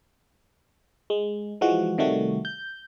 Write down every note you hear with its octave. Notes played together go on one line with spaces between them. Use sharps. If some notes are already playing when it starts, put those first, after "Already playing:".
G#3
E3 F3 G#3 F#4
C3 D#3 G3 A3 F#4
G6